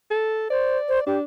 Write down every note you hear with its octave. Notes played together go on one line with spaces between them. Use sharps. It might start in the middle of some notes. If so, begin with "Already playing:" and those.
A4
C5 D5
C5
D4 G4